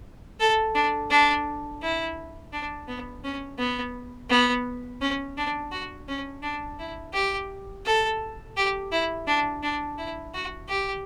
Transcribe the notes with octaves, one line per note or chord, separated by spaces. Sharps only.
A4
D4
D4
E4
D4
B3
C#4
B3
B3
C#4
D4
F#4
C#4
D4
E4
G4
A4
G4
E4
D4
D4
E4
F#4
G4